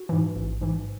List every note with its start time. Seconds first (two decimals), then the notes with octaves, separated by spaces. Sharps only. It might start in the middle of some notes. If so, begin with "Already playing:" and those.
Already playing: F#4
0.09 G#2 E3
0.36 A1
0.61 G#2 E3